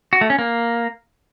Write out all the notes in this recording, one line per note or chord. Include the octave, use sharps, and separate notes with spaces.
F#4
A3
C#4
A#3